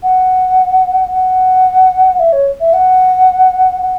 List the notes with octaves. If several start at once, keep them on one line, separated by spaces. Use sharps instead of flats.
F#5
F#5
E5
C#5
E5
F#5
F#5